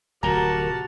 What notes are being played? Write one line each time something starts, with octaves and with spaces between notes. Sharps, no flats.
D1 C3 F3 F#4 G4 A#4 A5 A#5